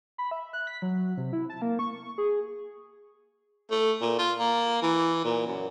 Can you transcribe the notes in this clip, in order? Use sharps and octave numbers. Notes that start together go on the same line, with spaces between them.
B5
E5
F#6
B6
F#3
C3
E4
A5
A#3
C#6
G#4
A3
A#2
F4
A#3
E3
A#2
F#2